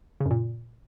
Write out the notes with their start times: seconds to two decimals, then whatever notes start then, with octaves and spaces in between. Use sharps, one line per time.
0.20 C#3
0.26 F#2
0.31 A#2